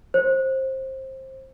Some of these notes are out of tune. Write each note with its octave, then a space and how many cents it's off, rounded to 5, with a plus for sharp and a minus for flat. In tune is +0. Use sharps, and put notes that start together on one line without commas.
C5 +20